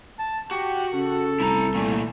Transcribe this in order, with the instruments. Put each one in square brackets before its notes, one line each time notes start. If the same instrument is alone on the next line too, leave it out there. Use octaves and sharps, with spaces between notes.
[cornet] A5
[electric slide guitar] F#4 [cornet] G4
[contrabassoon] C#3 [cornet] A4
[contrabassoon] C2 [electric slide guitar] E4 A#5
[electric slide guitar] A#2 E3 A3